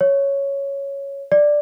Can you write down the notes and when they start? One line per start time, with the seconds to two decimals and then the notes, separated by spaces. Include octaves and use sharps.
0.01 C#5
1.32 D5